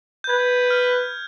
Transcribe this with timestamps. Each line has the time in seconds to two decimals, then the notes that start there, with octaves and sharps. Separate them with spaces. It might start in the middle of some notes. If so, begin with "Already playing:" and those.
0.24 G6
0.29 B4 G#6
0.71 F6